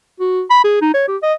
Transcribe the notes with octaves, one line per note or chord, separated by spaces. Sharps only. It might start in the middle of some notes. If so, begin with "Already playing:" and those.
F#4
B5
G#4
D#4
C#5
G4
D#5